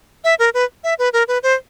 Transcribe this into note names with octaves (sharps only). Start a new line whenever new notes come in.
E5
A#4
B4
E5
B4
A#4
B4
C5